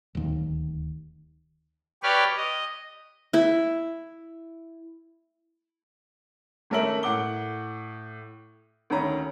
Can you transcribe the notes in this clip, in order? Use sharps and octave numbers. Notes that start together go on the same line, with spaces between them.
D1 D#2
G4 B4 C#5 D5 F6
D#5
E4 E5
G#1 A3 C#4 A#4 E5 F#7
A2 F#5 D6 G7
D2 D#3 C#4 A#5 B5